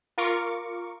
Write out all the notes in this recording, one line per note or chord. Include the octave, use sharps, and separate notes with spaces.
F4 A#4 C#6 D6